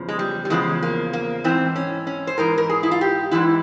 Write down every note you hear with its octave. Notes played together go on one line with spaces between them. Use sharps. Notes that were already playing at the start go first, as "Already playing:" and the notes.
Already playing: E2 C#3 F3
G#3
G3
G3
E2 C#3 F3 G#3
A#3
A#3
G#2 E3 C4
C#4
C#4
C5
G#2 E3 A#4
A#4
G#4
E4
F4
G4
G#2 E3 E4